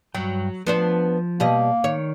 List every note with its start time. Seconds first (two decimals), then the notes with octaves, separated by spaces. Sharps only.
0.15 G2 F#3 G5
0.67 F3 B3 D4 C5
1.40 B2 G3 A#3 D#5
1.84 D#3 C#5